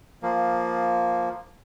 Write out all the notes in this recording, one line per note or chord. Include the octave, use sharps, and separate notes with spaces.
F3 A#3